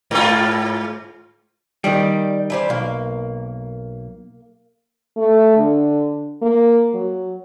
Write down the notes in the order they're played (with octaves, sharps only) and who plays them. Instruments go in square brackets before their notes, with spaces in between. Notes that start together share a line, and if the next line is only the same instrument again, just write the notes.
[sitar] G#2 F4
[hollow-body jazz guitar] D#3 G3 [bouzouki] G4 D5
[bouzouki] E3 G3 C5
[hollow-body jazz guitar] B1 [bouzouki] A#3
[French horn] A3
D3
A#3
F#3